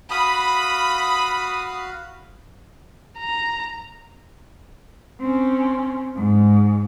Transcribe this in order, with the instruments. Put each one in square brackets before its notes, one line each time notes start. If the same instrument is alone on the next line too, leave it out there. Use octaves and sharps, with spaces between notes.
[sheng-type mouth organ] F#4 F5 [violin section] B5 [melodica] D#6
[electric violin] A#5
[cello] C4 C#4
G#2